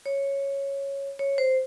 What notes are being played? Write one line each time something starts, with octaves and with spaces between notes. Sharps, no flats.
C#5
C#5
C5